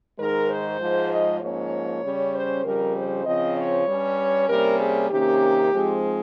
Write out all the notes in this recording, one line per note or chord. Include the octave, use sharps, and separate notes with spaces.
G#2 D#3 G#3 A#4
C5
G#2 F3 G#3
D#5
G#2 F3 A#3 C#4 C#5
C#3 G3 C#4
C5
F2 C#3 G3 A#4
C5
C#3 F3 C4 D#5
C#5
G2 G3 C#4
C3 G3 A#3 C#4 A#4
G#4
C3 D#3 A#3 C#4 G4
G#2 F3 G#3 C4